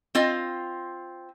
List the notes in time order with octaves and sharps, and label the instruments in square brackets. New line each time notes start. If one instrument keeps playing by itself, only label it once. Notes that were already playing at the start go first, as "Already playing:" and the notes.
[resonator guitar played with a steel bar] C4 F4 D#5